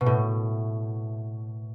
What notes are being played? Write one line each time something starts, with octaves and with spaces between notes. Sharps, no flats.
B2
A2